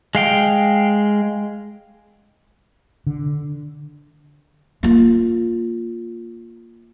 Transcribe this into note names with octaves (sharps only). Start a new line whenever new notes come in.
G#3 F5 G5
D3
A#3 F4